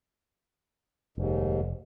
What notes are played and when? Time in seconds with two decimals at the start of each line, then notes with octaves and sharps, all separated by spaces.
1.18 F1 D#2 G#2